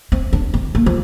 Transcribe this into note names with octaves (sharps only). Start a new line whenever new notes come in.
C4
D4
C4
A#3
F3